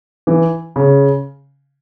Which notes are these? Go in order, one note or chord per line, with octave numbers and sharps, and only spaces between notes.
E3
C#3